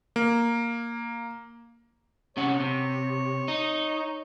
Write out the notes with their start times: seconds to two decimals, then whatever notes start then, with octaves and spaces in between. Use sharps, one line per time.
0.16 A#3
2.37 C3 C#4 C#5 F#5
2.60 C3
3.48 D#4